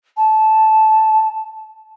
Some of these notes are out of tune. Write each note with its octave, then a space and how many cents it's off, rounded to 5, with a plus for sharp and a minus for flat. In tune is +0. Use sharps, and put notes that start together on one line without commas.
A5 -10